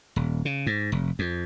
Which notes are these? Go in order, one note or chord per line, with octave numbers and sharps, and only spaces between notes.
D#1
C#3
G#2
F1
F2